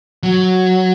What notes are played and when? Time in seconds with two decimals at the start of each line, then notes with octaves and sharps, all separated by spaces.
0.23 F#3